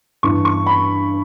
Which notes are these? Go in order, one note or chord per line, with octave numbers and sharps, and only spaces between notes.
G2 E3 C#6
C#6
B5